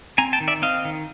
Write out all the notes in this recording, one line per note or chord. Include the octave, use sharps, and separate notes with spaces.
C4 G#5 A#5
G5 A5
D#3
D5 E5
C4 D#5 F5
D#3